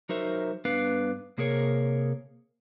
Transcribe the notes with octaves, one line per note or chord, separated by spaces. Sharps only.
F#3 D#4 F#4 A#4 C5 E5
G2 B3 D4 B4 F5
C3 A#3 G#4 A#4 C#5